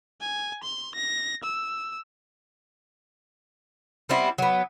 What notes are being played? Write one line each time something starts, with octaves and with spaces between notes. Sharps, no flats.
G#5
C6
A#6
E6
G3 B3 C4 E4
F#3 B3